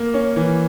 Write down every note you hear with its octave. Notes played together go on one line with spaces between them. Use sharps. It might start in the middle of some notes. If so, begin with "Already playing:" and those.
Already playing: A#3
C#4
E3